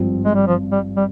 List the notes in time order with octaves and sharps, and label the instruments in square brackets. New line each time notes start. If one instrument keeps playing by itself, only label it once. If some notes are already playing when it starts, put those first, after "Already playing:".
Already playing: [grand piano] G#1 G2 F3 C4 F4
[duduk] G#3
G3
F3
G3
G3